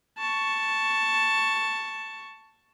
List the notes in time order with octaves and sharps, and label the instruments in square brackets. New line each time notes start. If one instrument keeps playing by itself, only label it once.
[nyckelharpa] A5 C#6